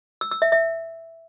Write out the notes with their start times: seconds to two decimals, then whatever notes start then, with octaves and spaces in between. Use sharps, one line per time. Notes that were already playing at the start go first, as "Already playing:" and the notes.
0.21 E6
0.32 E6
0.42 E5
0.52 E5